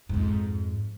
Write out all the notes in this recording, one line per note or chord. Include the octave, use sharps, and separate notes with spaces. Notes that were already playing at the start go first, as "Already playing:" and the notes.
F2 G#2